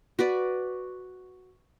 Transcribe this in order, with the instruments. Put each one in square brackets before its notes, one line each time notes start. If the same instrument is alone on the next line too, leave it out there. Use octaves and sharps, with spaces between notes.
[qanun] F#4 B4 D5